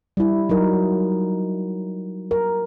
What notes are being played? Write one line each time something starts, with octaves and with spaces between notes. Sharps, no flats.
G3 E4
F#3 D#4 A#4
A#4